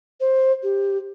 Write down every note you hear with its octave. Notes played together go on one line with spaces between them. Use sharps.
C5
G4